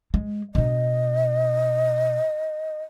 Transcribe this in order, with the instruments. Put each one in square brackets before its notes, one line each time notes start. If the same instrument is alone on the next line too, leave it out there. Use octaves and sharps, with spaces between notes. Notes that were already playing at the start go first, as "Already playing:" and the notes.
[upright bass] G#3
[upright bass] B2 D4 [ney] D#5